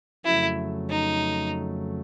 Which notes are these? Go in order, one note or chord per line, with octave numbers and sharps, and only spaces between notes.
F2 C#3 F#3 A3 E4
D#4